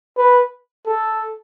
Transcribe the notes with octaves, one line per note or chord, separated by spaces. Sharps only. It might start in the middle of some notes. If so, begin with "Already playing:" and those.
B4
A4